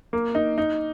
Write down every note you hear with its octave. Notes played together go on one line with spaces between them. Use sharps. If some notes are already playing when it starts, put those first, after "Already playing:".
A#3
D#4
D#4